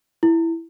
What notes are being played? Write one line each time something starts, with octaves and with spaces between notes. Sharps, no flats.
E4